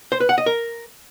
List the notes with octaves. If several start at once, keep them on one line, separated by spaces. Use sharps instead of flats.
C5
B4
F#5
D#5
A#4